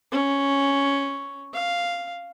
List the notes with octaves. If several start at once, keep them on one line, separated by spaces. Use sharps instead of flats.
C#4
F5